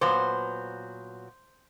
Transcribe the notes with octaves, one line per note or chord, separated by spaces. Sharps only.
A#2 F#3 B3 C5